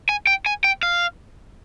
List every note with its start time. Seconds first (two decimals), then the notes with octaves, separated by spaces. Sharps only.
0.09 G#5
0.27 G5
0.46 G#5
0.64 G5
0.83 F5